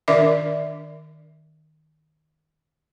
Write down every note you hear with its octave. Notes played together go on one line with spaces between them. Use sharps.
D#3 D4 A#4 D5 E5 D6